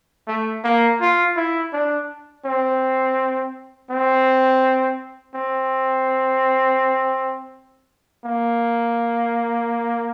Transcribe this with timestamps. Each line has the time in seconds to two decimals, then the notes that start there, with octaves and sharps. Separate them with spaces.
0.27 A3
0.64 A#3
1.01 F4
1.36 E4
1.73 D4
2.46 C4
3.91 C4
5.35 C4
8.25 A#3